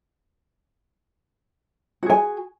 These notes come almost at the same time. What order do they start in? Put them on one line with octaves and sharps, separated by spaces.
F#4 G#4 G#5